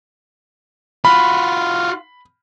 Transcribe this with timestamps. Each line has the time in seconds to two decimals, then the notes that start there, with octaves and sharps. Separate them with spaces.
1.05 F4 F#4 B5